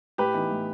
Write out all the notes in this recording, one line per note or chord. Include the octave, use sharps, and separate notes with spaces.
A2 G4 B4
E3 B3 D#4
A2